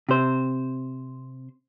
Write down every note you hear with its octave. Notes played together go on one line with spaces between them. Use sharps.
C3 C5